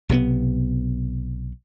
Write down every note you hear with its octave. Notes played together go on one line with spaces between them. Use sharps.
B1 C3 F3 B3